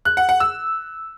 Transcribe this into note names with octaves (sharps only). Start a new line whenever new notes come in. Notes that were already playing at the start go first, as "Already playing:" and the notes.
F#6
F#5
F#5
E6